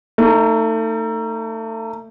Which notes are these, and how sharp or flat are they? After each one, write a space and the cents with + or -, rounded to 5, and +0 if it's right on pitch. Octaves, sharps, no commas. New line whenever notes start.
A3 +30 D#4 +0